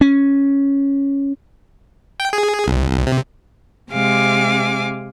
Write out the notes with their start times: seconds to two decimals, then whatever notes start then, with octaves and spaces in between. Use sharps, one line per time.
0.01 C#4
2.20 G5
2.33 G#4
2.67 C2
2.93 C2
3.07 C3
3.91 C3 G#3 F5 G#5 D6